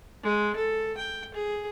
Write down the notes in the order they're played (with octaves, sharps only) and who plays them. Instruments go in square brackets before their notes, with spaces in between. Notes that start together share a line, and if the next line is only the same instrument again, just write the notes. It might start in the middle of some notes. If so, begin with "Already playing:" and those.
[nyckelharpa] G#3
A4
G5
G#4